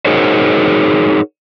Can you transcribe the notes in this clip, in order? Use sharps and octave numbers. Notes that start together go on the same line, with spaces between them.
D#4 F#4 G#4 A#4 C5 C#5